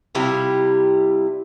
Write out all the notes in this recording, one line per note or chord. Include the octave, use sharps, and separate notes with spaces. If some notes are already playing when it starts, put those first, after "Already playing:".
C3 G3 E4 F4